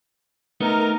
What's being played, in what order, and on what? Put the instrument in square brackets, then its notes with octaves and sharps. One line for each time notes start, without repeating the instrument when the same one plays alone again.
[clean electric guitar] A3 B3 D#4 [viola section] A#4